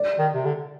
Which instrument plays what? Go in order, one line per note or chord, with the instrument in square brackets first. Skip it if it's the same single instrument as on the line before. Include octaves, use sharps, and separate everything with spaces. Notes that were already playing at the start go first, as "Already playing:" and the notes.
Already playing: [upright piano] D5
[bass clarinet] D#3
C3
D3